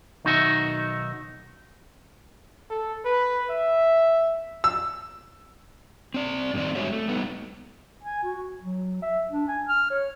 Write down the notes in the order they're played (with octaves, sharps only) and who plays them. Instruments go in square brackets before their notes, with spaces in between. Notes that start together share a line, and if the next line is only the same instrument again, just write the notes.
[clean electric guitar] B1 D#3 D#4 F#4 A4 E5
[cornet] A4
B4
E5
[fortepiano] E6
[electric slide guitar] C4 D5
G2 D3 D#3 C4 D5
G3 G#3 F#4 C#5 E5
A3
G3 B3 D#4
[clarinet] G#5
F#4
F#3
E5
D4
G#5
F6
C#5